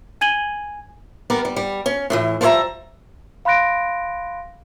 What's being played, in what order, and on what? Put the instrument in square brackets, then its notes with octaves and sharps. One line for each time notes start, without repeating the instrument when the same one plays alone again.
[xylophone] G#5 G#6 D#7 F#7 G7
[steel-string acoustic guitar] G3 B3 A#4 D5
G3
G3
C#4
A2 C3 E3
F3 G3 B4 C#5 E5 A#5
[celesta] F5 B5 C6 F#6 A#6 D7